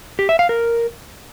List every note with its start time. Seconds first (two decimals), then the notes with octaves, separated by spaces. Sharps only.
0.19 G4
0.29 E5
0.39 F5
0.49 A#4